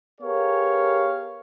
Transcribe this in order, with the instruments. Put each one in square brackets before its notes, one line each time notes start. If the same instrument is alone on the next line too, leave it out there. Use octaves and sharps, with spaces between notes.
[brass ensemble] B3 G4 G#4 A#4 C#5 F5